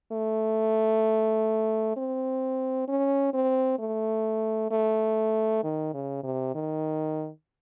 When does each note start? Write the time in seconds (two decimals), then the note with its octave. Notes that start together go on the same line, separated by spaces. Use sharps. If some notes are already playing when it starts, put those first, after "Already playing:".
0.12 A3
1.97 C4
2.88 C#4
3.34 C4
3.79 A3
4.71 A3
5.63 D#3
5.94 C#3
6.23 C3
6.55 D#3